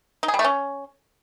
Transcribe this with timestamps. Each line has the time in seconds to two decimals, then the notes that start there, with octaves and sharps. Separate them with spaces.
0.23 D#4
0.28 G#4
0.34 G3
0.39 A3
0.44 C#4